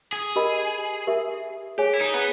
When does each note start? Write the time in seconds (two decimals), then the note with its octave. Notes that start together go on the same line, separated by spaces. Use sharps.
0.13 G#4
0.36 G4 A#4 D#5 G#5 B5
1.07 G4 A#4 E5
1.78 G4 G#4 C#5 G#5
1.93 E4
2.01 D#4
2.14 B3